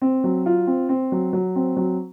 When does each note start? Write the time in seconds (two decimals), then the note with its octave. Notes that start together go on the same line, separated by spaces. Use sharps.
0.02 C4
0.24 F#3
0.46 F4
0.67 C4
0.89 C4
1.12 F#3
1.33 F#3
1.56 C4
1.77 F#3